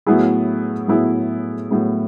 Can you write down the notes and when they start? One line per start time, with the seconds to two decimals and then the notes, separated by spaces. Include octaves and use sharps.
0.06 A2 F#3 B3 E4 G#4
0.88 A2 F#3 B3 E4 G#4
1.71 A2 F#3 B3 E4 G#4